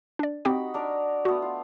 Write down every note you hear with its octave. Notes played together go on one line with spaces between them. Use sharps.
D4 D5
C4 D#4 F#4 G4 G5 B5
D4 A#4
A3 B3 F#4
F4